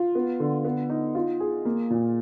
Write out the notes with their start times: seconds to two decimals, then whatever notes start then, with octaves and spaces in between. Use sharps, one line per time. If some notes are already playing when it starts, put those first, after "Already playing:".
Already playing: F4
0.15 B3
0.40 D3
0.65 B3
0.89 D#4
1.15 F4
1.40 G#4
1.65 A#3
1.90 A#2